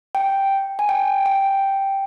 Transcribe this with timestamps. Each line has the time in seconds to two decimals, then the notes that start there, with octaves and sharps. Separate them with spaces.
0.15 G5
0.79 G#5
0.89 G5
1.26 G5